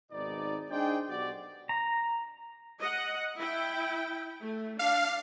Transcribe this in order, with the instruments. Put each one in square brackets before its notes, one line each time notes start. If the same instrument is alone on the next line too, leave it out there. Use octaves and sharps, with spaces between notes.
[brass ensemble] G#1 B2 D#4 D5
D4 D#4 G#4 C5 D5 G5
B1 F#4 G4 D5
[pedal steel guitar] A#5
[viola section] D#5 F#5
E4 G5
A3
[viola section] D4 [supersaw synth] F5